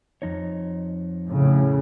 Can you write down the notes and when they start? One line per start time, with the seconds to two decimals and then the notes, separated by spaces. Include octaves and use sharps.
0.22 F2 D#4 C#5
1.28 A2 C#3